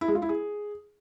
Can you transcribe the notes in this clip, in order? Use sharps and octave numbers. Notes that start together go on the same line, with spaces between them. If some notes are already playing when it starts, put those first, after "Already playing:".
E4
G#3
F4
E4
G#4